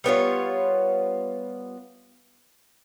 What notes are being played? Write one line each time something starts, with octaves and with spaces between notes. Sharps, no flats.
G3 B3 F4 C#5